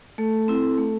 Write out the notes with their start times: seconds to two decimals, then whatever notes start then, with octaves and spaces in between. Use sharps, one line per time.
0.18 A3 A4
0.48 C4 E4
0.78 A3